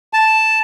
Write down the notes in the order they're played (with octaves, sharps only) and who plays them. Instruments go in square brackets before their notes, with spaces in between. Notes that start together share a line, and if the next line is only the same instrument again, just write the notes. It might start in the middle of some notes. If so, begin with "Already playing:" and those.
[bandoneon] A5